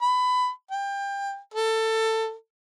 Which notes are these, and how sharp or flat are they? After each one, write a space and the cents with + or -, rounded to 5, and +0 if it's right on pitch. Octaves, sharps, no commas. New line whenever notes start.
B5 +20
G5 +25
A4 +20